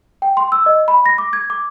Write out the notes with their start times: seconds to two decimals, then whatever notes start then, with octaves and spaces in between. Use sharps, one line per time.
0.22 G5
0.37 C6
0.52 E6
0.66 D#5
0.88 B5
1.06 A#6
1.18 D6
1.33 G#6
1.50 D6